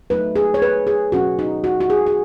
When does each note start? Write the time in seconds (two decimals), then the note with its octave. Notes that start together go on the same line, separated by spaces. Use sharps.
0.10 F#3 A3 D#4 B4
0.36 G#4
0.54 C#5
0.62 B4
0.87 G#4
1.12 B2 F#3 C#4 F#4
1.39 D#4
1.64 F#4
1.81 F#4
1.90 G#4
2.06 G#4